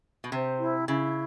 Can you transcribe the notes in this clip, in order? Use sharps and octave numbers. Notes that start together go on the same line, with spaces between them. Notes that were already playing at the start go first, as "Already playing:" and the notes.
B2
C3 C5
E4
C#3 E4